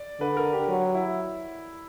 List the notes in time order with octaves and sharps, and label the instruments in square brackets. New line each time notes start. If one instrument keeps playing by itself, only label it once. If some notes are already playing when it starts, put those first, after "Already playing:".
Already playing: [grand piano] D5
[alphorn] D3 [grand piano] B4
[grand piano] A#4
G4
[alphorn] F#3
[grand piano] E4